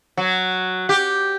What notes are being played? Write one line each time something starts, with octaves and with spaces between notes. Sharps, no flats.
F#3
G4